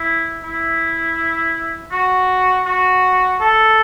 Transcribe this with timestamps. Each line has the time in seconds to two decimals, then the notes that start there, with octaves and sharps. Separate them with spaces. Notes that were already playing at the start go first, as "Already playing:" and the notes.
Already playing: E4
0.44 E4
1.91 F#4
2.66 F#4
3.41 A4